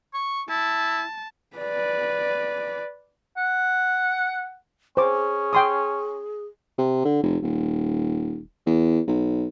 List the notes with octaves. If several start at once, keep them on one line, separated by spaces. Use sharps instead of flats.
C#6
E4 A5
B4 D5
F#5
C#4 G#4 C5 D6
G5 C6 D#6
C3
D3
F1
D#1
E2
B1